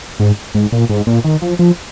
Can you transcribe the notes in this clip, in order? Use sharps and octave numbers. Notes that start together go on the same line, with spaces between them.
G#2
G#2
A#2
G#2
A#2
D#3
F3
F3